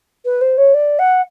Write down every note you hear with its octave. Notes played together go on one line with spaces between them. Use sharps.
B4
C5
C#5
D5
F#5